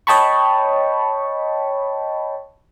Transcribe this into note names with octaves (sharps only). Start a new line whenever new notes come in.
C#5 D#5 G5 A5 B5 C#6